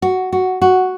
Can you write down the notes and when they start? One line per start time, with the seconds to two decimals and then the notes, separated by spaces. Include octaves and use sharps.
0.02 F#4
0.33 F#4
0.62 F#4